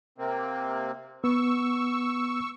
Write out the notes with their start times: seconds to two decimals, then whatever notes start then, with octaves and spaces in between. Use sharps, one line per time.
0.18 C3 A#3 C4
1.24 B3 C#6 E6